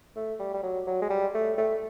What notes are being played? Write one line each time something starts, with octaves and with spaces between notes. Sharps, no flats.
A3
G3
G3
F#3
F#3
G#3
G3
A3
A3